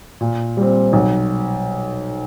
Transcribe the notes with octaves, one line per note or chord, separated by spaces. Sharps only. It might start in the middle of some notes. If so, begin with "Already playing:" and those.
A#2
G3 C4
B1